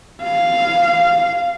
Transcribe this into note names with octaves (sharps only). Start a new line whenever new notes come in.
F5